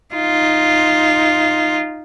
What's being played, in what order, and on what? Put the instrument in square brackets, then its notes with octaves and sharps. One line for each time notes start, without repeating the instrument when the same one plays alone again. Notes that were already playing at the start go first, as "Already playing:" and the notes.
[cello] D#4 F4